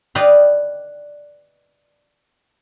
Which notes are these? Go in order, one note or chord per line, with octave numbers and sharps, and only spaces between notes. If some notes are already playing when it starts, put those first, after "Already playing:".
B4 D5 D#5 F5 G5